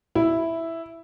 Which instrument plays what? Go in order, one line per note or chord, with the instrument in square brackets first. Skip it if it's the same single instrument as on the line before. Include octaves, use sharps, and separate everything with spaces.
[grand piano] E4